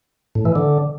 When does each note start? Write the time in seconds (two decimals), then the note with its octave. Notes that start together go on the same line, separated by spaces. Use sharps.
0.35 A2
0.45 E3
0.55 D3